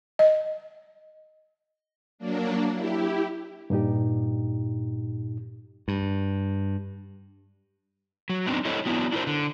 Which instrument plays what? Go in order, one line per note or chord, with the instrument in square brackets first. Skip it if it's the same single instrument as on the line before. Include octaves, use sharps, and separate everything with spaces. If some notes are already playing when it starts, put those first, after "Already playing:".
[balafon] D#5
[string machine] F#3 A#3 D4
E4 G4
[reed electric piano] G2 A#2 D#4 G4
[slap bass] G2
[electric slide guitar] F#3
B3 C4 D4 D#4
E4 A4 C5 C#5 D#5
F#3 B3 D4 E4
D4 E4 F4 A#4 C5
D3